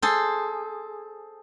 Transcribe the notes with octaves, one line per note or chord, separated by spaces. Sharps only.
G#4 A4 C5